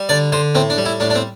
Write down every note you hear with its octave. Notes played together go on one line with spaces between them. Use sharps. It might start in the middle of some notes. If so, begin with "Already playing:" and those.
Already playing: G3
D3 D5
D3 C5
A2 C4
D4
G3
E4
A2 D4
D4
C4